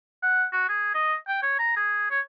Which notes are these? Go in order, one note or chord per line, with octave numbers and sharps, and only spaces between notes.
F#5
F#4
G#4
D#5
G5
C#5
A#5
G#4
C#5